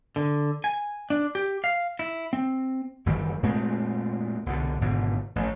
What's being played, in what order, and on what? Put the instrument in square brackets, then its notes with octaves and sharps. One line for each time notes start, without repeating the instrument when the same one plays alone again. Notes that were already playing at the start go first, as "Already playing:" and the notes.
[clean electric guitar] D3
G#5
D4
G4
F5
E4
C4
[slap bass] F#1 D#3 E3 G3
A#2 G#3 A3 C4
C2 B2 D3
G#1 G#2 B2 D3
A1